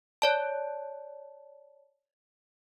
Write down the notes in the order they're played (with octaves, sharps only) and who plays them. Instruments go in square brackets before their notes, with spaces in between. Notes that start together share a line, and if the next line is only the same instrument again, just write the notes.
[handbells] C#5 D5 A5